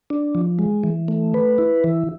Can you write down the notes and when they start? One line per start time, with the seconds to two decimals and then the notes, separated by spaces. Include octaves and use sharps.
0.10 D4
0.35 F3
0.59 G#3
0.83 E3
1.08 A3
1.34 B4
1.58 E4
1.84 E3